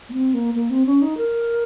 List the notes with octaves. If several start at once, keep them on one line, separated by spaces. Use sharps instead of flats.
A#3
C4
A#3
A#3
C4
C#4
D#4
A#4